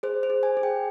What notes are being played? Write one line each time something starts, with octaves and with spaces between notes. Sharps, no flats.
G#4 C5
C5
G#4
G#5
G#4
G5